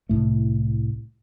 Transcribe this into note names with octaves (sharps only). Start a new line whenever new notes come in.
C2 A2 A3